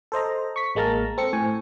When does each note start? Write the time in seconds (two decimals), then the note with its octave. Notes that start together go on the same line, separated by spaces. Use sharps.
0.12 A4 C5 D#5 A#5
0.56 C#6 B6
0.75 A1 G#3 A#3 A5 A#5 F6
1.18 C4 A4 C#7
1.33 A2 G#5 C#6